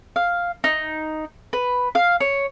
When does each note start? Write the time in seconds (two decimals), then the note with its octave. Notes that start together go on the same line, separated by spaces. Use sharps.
0.16 F5
0.64 D#4
1.53 B4
1.95 F5
2.20 C#5